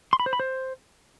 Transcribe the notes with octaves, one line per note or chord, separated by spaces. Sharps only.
C6
B5
C5
B5
C5